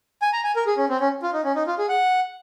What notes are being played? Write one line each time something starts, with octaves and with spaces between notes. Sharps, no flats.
G#5
A#5
G#5
A#4
G#4
C#4
C4
C#4
F4
D#4
C#4
D#4
F4
G#4
F#5